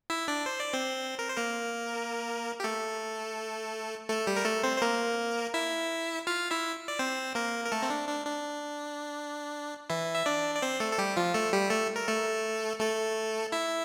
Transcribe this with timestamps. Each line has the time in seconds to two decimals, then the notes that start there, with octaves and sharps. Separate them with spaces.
0.10 E4 E5
0.28 D4 D5
0.46 C5
0.60 D5
0.73 C4 C5
1.19 A#4
1.28 C5
1.37 A#3 A#4
2.60 G4
2.64 A3 A4
4.09 A3 A4
4.27 G3 G4
4.36 A#4
4.45 A3 A4
4.63 C4 C5
4.77 C5
4.82 A#3 A#4
5.54 E4 E5
6.27 F4 F5
6.51 E4 E5
6.88 D5
6.99 C4 C5
7.35 A#3 A#4
7.64 A#4
7.72 A3 A4
7.82 C4
7.90 D4
8.09 D4
8.26 D4
9.90 E3 E4
10.15 E5
10.26 D4 D5
10.55 D5
10.62 C4 C5
10.80 A3 A4
10.92 A4
10.98 G3 G4
11.17 F3 F4
11.34 A3 A4
11.53 G3 G4
11.71 A3 A4
11.96 A#4
12.07 A3 A4
12.80 A3 A4
13.52 E4 E5